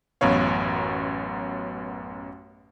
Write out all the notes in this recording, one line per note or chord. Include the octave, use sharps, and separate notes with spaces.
A1 F#2 B3 B4 C#5 F5